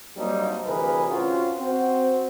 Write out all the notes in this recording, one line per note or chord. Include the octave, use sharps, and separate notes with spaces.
F#3 G3 A#3 C4 D4 D#4
D2 C3 E3 G#4 A#4 B4
C4 C#4 F4 F#4
C4 F#4